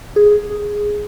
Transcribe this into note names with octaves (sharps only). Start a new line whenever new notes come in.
G#4